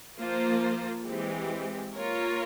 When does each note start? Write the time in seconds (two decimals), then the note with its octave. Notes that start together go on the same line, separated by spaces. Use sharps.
0.18 F3 A#3 F4 C5
1.06 E3 G#3 C4 G4
1.95 A#3 F4 A#4 C#5